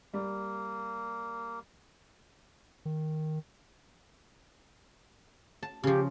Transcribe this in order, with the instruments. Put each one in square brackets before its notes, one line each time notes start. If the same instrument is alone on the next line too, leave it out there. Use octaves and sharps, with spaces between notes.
[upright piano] G3 [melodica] A#3
[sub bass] D#3
[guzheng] A5
[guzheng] C#3 F3 [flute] G4